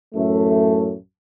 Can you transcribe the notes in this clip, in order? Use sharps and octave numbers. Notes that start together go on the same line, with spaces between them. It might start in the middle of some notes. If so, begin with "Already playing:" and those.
A1 F#2 A3